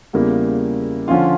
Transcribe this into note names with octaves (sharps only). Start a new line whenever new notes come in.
E2 C#3 G3 A#3 E4
D3 F3 C#4 F4